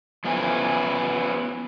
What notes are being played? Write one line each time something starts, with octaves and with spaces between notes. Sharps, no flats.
F3 B3 C#4 E4 G#5